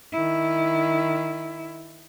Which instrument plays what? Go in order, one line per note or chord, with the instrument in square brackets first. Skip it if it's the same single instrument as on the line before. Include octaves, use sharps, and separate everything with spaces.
[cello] D#3 E4